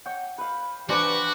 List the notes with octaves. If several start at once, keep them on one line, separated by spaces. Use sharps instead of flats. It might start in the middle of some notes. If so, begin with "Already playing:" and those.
C#5 F#5 G5
B4 F5 B5
E3 D4 F#4 G4 B4 C5 G#5